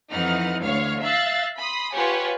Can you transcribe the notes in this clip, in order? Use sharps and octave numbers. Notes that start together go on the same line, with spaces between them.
F2 E3 D#4 F#5 F6
D2 C#5 F5 F6
E5 F5 E6 F#6 A6
B5 C6 D#6
F4 G4 B4 C#5 F#5 G#5